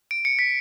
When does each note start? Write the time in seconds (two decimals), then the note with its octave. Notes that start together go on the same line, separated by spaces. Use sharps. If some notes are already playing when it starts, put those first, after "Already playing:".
0.11 D7
0.25 C#7
0.39 B6